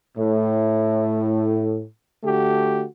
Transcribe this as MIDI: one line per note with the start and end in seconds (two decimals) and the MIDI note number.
0.18 1.83 45
2.24 2.84 50
2.24 2.84 57
2.24 2.84 66
2.24 2.84 67